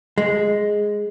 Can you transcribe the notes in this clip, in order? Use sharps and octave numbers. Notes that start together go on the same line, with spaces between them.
G#3